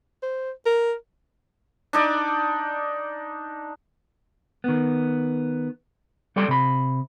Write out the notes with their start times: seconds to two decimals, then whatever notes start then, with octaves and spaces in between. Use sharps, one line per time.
0.23 C5
0.66 A#4
1.93 D4 D#4 D5
4.64 D#3 B3
6.36 G3 A4 D5 G5 C6
6.48 C3 B5